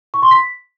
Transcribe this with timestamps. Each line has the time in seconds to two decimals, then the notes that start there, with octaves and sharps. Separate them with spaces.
0.14 C#6
0.22 C6
0.31 B6